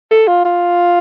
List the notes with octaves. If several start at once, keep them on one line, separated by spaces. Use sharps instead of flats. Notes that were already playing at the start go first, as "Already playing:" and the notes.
A4
F4
F4